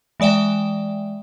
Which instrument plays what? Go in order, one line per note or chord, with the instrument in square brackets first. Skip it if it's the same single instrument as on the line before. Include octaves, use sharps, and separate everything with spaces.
[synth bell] E3 G#3 D5 E5 G5